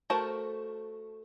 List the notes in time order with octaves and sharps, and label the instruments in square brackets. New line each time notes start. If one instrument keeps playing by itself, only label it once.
[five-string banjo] A3 F#4 A#4 C5 A5